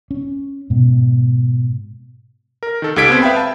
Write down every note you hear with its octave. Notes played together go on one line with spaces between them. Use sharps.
C#4
G#2 B2
A#4
D#3 A4
C#2 G4 A4 G#6 B6 D7
B3 C4
B4 E5 F5 G5 B5
A5